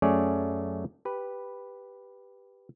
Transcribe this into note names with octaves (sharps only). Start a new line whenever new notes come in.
F#2 A3 C#4 G#4 C#5 D5
G4 B4